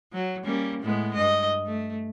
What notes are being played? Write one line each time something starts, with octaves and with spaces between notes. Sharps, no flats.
F#3
G3 A#3 C#4
A2 G#3 B3
G2 D#5
A3